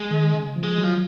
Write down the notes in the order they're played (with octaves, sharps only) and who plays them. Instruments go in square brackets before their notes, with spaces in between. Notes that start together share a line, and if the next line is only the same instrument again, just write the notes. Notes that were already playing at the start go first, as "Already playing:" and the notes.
Already playing: [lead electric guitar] G#3
[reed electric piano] D#3
C#3
F3
[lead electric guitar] G#3
[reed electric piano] F#3
[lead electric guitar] F3